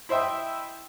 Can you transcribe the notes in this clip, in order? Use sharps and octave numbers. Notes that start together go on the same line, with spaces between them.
E4 C5 D#5 E5 G5